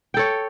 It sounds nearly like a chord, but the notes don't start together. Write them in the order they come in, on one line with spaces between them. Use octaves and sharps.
G5 A4 C#5